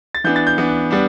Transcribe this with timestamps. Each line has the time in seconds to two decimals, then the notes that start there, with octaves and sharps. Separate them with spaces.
0.15 A6
0.24 E3 B3 D4 G6
0.36 A6
0.47 G6
0.58 E3 B3 D4
0.91 G3 B3 D4